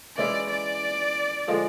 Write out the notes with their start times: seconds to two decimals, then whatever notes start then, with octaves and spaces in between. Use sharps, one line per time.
0.17 E3 G#3 C#4 E4 D5
0.49 D5
1.48 D3 F3 G#3